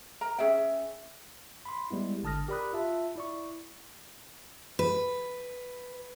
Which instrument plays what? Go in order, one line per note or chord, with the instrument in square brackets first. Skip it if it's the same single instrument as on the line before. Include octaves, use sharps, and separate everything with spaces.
[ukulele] A#4 A#5
C#4 G#4 E5 G5
[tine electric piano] B5 C6
G3 G#3 B3 E4
G#1 D3 A5 D#6 F6 A#6
G4 A#4 D5 B5 D#6 F#6
F4 E5 A5
E4 D5 C#6
[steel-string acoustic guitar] B4